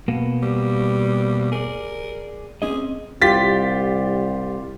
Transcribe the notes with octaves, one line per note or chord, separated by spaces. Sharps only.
B2 A#3 B3
G3
G#4 A#4 D5
C4 C#4 G#4 D#5
C2 F4 G4 A6 B6